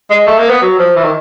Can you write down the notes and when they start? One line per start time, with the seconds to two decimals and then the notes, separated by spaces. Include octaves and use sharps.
0.10 G#3
0.27 A3
0.38 A#3
0.50 B3
0.62 F#3
0.79 F3
0.96 E3
1.04 D#3